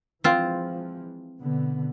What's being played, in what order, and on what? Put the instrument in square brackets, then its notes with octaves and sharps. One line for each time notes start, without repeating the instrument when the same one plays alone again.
[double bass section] E3 F3 G#3 [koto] C4 F4
[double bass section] B2 D3 B3